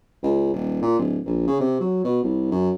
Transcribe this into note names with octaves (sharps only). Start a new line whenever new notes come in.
C#2
D#1
A#2
D1
A#1
C#3
C3
F#3
B2
C2
F#2